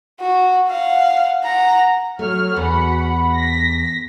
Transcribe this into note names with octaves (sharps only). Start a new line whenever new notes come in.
F#4
F5 F#5
F#5 A#5
F#3 A3 C#5 F6
E2 F#4 F#5 B5
A#6 B6